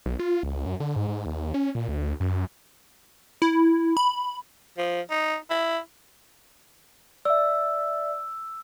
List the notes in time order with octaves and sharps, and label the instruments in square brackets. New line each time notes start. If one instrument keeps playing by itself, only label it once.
[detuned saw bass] B1
F4
C#2
F#2
D3
G#2
G#2
D#2
C#4
A#2
D2
F#2
[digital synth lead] E4
B5
[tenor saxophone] F3
D#4
E4
[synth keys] D5 E5 [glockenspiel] E6